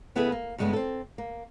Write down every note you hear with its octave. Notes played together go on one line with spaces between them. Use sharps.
C#3 B3 E4 G#4 A4 B4
A#3
G2 C#3 G#3 A3 B3
C4 A4
A#3